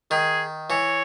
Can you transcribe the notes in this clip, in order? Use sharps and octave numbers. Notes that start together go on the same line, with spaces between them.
D#3 G#4
E3 C#5